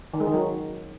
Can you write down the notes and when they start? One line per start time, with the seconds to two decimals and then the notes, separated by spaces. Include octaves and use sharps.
0.14 D#3
0.20 G#3
0.27 D#3
0.34 F#3